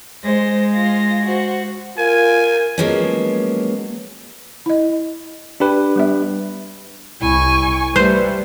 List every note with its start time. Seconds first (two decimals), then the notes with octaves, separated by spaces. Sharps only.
0.24 G#3 C5 A#6
0.74 F4 A#6
1.25 F#4 C5
1.98 F4 A#4 G#5
2.78 F3 F#3 G#3 A#3 B3 C#4
4.66 E4 D#5
5.60 D4 G4 B4
5.95 G3 B3 E5
7.22 C2 E4 G#5 C#6
7.96 G3 A3 B4 C5